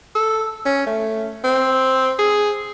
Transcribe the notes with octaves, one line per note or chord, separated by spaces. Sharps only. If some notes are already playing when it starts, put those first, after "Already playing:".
A4
C#4
A3
C4
G#4